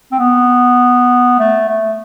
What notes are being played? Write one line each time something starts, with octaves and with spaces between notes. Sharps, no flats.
C4
B3
A3
A3